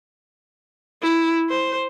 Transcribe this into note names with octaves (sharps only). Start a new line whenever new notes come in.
E4
C5